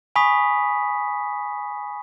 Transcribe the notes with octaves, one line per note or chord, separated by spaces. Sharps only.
G#5 B5 C#6 D#6 B6